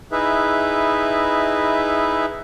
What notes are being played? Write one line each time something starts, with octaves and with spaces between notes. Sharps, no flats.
D#4 E4 G#4 B4 E5